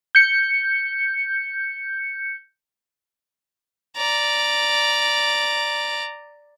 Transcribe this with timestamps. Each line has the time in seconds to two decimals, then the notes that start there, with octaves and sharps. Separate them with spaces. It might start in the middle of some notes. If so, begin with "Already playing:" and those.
0.15 G6 C#7
3.97 D5 A#5